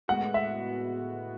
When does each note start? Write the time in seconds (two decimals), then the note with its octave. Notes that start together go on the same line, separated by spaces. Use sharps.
0.08 A2 G#3 B3 F#4 F#5
0.34 E5